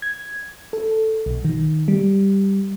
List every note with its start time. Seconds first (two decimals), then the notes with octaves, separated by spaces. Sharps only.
0.02 G#6
0.73 A4
1.26 B1
1.45 D#3
1.88 G3